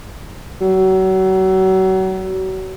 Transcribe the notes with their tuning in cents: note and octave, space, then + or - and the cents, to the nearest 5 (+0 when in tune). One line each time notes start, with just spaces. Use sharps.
F#3 +35